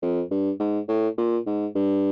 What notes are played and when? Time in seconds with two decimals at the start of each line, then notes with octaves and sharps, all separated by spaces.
0.02 F2
0.31 G2
0.60 G#2
0.88 A2
1.18 A#2
1.47 G#2
1.75 G2